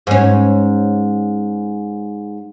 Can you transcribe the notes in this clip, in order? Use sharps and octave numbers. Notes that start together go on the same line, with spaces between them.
G#2 C#4